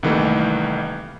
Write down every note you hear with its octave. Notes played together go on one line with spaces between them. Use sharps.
C2 D#3 E3 A3 A#3